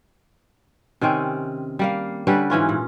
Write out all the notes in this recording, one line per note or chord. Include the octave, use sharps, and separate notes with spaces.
C3 D#3 C4 C#4
G3 A#3 F5
D3 G3 C#4 B4
G#2 E3 C#4 F4
A#2